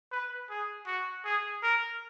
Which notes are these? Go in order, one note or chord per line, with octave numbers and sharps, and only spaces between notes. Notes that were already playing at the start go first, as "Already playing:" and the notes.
B4
G#4
F#4
G#4
A#4